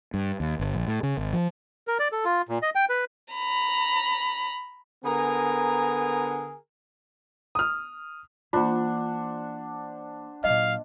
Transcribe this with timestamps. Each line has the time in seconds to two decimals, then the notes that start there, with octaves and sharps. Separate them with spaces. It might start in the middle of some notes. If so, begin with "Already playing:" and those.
0.14 G2
0.40 D#2
0.59 G1
0.75 A#1
0.88 A2
1.03 C#3
1.17 G#1
1.33 F3
1.88 A#4
1.99 D5
2.12 A4
2.25 F4
2.49 A#2
2.62 D#5
2.75 G5
2.89 B4
3.33 A#5 B5
5.04 D3 B3 G#4 A#4 G#5 A#5
7.55 D#6 F6
8.53 E3 A#3 D4 F4 C5 F#5
10.44 A#2 F#3 D#5 F5